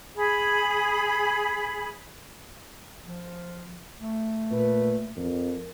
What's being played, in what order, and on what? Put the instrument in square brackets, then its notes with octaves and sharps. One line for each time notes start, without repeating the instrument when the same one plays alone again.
[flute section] G#4 B5
[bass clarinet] F3
A3
[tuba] A#2 [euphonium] B4
[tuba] F2 [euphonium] A#4